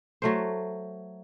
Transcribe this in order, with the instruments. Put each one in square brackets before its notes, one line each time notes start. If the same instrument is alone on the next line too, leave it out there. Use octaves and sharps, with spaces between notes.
[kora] F#3 A3 C5